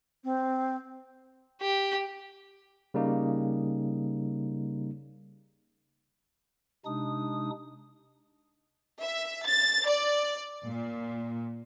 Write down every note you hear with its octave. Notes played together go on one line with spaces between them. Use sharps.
C4
G4
C#3 G3 A#3 D#4
C3 G#3 D4 D#4 D#6
E5
A6
D5
A#2